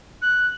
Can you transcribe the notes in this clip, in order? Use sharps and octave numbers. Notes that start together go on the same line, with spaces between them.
F#6